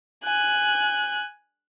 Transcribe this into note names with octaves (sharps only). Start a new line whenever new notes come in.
G#5 F#6